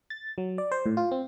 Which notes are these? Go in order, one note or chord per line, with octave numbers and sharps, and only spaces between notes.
A6
F#3
D5
C5
A2
F4
C4